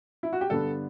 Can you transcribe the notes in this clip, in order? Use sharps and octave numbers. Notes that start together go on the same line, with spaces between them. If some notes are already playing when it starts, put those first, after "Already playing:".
E4
F#4
G4
G2 D3 G3 B3 D4 A4